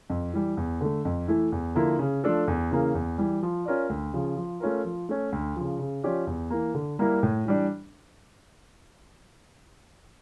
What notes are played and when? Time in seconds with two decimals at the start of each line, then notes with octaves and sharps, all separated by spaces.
0.10 F2
0.33 E3 G3
0.57 E2
0.81 D3 A3
1.05 F2
1.28 E3 A3 E4
1.52 E2
1.75 D3 F3 A#3 E4
1.99 C#3
2.24 F3 A3 D4 A4
2.47 E2
2.71 C#3 E3 A#3
2.95 E2
3.18 E3 G3
3.43 F3
3.65 C#4 F4 A#4 D5
3.89 D2
4.13 C#3 F3
4.37 F3
4.60 A3 C#4 F4 A#4
4.85 F3
5.09 A3 C#4
5.32 D2
5.56 C#3 F3
5.79 C#3
6.03 F3 C#4 G4 D5
6.27 E2
6.50 E3 A#3
6.74 D3
6.99 G3 A#3 E4 A#4
7.23 A2
7.45 E3 G3 D4